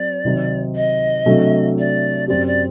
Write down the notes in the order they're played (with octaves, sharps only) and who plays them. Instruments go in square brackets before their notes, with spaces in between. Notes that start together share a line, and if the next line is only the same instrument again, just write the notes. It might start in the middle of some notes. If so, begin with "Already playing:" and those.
Already playing: [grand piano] F#3 C4 [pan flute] D5
[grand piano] C3 D#3 F#3 C4 D#4
[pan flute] D#5
[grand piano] C3 F#3 A3 D4
[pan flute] D5
[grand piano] F#2 F#3 C4 G4 [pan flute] D5
[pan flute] D5